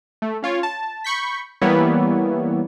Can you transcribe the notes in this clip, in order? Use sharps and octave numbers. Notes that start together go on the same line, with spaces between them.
A3
C#4 F4 C#5
A5
B5 C#6 G6 B6
E3 G3 A#3 B3 E4 C#5